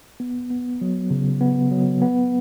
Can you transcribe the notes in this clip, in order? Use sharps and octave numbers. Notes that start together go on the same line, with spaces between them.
B3
B3
F#3
C#3
B3
F#3
B3